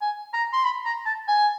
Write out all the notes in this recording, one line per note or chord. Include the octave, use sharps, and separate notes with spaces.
G#5
A#5
C6
B5
A#5
A5
G#5